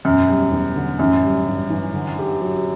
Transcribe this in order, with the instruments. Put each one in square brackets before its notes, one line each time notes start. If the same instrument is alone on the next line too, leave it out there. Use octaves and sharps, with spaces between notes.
[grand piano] E1 [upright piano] F#2
[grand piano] G3
E2
D3
[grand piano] A1 [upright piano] F#2
[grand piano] G3
G2
E3
D3
G4
F#3